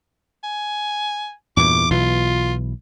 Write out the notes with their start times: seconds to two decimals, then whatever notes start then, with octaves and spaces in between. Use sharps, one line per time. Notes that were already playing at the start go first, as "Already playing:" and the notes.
0.44 G#5
1.57 E2 G2 A#2 D6
1.91 B1 B2 E3 F4